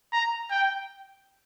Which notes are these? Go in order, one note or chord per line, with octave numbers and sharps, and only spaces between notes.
A#5
G5